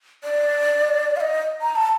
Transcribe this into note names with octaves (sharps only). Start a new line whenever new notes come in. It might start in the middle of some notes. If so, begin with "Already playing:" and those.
D5
F5
D#5
A#5
A5